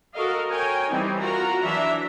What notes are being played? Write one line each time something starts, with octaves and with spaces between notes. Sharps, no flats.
F#4 A4 A#4 D#5 F5
A#4 C#5 G5 G#5
E3 G3 C4 D#4
F4 F#4 A#4 A#5
E3 F#3 D4 E5 A#5